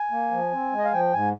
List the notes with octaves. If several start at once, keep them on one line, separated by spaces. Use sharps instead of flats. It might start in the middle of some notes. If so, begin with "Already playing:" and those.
Already playing: G#5
A#3
F3
C4
G#3
D#5
F5
F3 G5
G#2 G#5